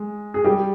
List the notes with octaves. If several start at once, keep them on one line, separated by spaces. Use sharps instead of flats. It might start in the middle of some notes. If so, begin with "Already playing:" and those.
Already playing: G#3
G#4
G3 G4